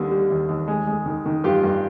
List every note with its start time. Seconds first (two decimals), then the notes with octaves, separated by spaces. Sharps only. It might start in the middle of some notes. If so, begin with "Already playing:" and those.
Already playing: D#2 D3 G3 A#3
0.11 G3
0.30 D#2
0.49 D#2
0.68 G#3
0.87 G#3
1.06 D#3
1.26 D#3
1.44 G2 F4 G4
1.63 G2